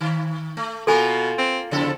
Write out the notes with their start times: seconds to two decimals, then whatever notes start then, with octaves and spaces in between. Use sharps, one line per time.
0.01 D#3
0.57 A3
0.87 B2 A#3 F4 A4 A#4 G#5
1.38 C4
1.71 E2 C#3 F3 A4